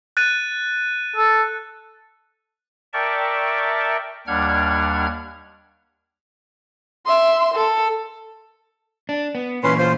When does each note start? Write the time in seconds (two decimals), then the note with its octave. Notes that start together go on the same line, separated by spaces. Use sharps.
0.17 F#6 A6 D#7
1.16 A4
2.93 A#4 D5 E5 G5 A5 C#6
4.27 D#2 G3 D4 F#5 F6 G#6
7.06 E5 C6
7.54 A4
9.09 D4
9.35 B3
9.64 A#2 E3 C#4 B4 C6
9.78 F4 C5